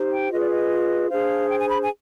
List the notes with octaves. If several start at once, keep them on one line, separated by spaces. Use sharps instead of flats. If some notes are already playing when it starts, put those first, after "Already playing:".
Already playing: D#4 G4 C5
G5
F4 G#4 B4 D#5
D5
D#5
D4 G#4 C5 F5
G5
G#5
B5
G#5